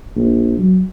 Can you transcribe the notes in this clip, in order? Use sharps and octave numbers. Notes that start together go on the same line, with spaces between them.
A#1
F#3